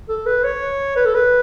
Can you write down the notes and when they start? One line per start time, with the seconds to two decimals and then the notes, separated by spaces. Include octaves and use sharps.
0.09 A4
0.26 B4
0.44 C#5
0.97 B4
1.06 A4
1.15 B4